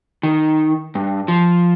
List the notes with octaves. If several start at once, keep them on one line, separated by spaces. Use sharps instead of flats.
D#3
G2
F3